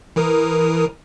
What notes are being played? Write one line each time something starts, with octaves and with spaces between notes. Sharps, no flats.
E3 A#4 D#6